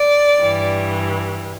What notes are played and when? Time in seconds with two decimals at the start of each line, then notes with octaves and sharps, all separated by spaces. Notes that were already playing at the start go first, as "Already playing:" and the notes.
Already playing: D5
0.41 G2 E3 G3